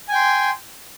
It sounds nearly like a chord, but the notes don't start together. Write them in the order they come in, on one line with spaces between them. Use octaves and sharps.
G#5 G5 C6